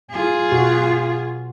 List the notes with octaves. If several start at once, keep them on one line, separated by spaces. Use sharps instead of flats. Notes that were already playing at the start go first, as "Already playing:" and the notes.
F4 G#4
B2 F#4